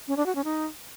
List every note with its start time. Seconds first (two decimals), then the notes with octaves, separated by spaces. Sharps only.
0.08 C#4
0.17 D4
0.26 F#4
0.35 C#4
0.44 D#4